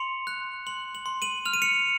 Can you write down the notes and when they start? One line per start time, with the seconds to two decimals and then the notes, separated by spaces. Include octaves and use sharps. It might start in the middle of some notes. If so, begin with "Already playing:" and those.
Already playing: C6 C#7 F7
0.27 F#6
0.67 C6 F#7
0.95 F#7
1.06 C6
1.22 D#7 F#7
1.45 F6 F7
1.54 D#7
1.62 C#7 F7